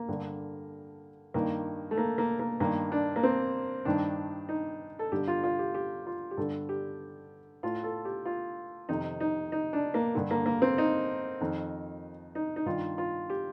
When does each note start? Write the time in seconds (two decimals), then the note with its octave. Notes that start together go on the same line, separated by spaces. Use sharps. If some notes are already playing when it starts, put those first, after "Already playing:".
Already playing: A#3
0.09 G2 D3
1.34 G2 D#3 A#3
1.91 A3
1.97 A#3
2.18 A#3
2.39 A#3
2.60 G2 D#3 A#3
2.92 D4
3.16 A#3
3.23 C4
3.85 G2 D#3 D4
4.49 D#4
4.99 A4
5.12 G2 D3 G4
5.28 F4
5.44 F4
5.59 G4
5.74 G4
6.06 F4
6.31 G4
6.37 G2 D3 A4
6.69 G4
7.63 A2 F4
7.84 A4
8.05 G4
8.26 F4
8.89 F2 C3 D#3 D#4
9.20 D#4
9.52 D#4
9.73 D4
9.94 A#3
10.15 G2 D3
10.31 A#3
10.46 A#3
10.62 C4
10.78 D#4
11.41 F2 D#3
12.35 D#4
12.56 D#4
12.66 G2 D#3 F4
12.98 F4
13.30 G4